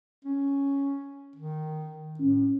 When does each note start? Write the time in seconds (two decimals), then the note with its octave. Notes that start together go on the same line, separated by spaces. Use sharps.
0.25 C#4
1.36 D#3
2.20 A2 C#4